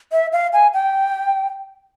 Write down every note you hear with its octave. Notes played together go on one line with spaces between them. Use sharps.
E5
F5
G#5
G5